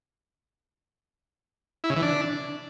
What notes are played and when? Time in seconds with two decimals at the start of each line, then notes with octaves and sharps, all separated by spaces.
1.84 E4
1.90 C#3
1.96 E3
2.02 D4